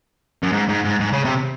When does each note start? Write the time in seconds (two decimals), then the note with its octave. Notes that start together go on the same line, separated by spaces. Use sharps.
0.43 F#2
0.52 G#2
0.68 G#2
0.85 G#2
1.00 G#2
1.13 C#3
1.25 C3